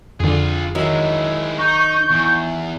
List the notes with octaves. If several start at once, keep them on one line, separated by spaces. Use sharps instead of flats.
F2 D3 F4 G#4
D#3 F#3 G#3 E4 E5
D#4 C#6 G6
E2